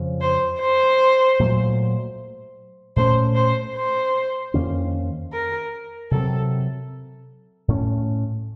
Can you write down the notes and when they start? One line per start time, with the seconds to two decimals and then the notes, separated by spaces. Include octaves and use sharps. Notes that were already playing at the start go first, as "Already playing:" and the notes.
Already playing: F2 C#3 F3
0.21 C5
0.61 C5
1.39 A#2 F#3 A3
2.96 A#2 A3 C#4 C5
3.35 C5
3.75 C5
4.54 F2 D#3 A#3 C#4
5.33 A#4
6.11 C3 F#3 C4 A4
7.68 A2 A3 C#4